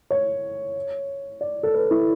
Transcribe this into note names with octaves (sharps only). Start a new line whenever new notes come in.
C#5
D5
A4
B4
E4